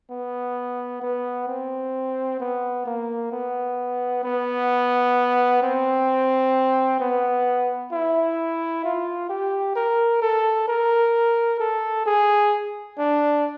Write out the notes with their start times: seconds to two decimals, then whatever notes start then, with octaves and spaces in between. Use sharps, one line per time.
0.10 B3
1.02 B3
1.48 C4
2.40 B3
2.86 A#3
3.32 B3
4.24 B3
5.62 C4
7.00 B3
7.92 E4
8.84 F4
9.29 G4
9.76 A#4
10.22 A4
10.68 A#4
11.60 A4
12.06 G#4
12.98 D4